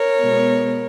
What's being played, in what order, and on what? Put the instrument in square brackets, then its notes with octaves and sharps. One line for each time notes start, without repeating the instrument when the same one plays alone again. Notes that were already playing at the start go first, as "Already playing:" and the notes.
Already playing: [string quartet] A#4 C#5
B2 G#3 B3